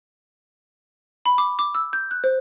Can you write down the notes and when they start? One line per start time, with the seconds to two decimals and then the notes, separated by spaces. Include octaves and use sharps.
1.26 B5
1.38 D6
1.59 D6
1.75 E6
1.93 G6
2.11 F#6
2.24 C5